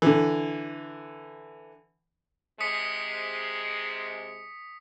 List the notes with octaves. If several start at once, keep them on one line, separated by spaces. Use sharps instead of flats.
D3 E3
C3 G#3 D#6 B6 C#7